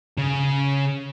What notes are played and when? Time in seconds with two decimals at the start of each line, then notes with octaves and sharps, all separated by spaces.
0.18 C#3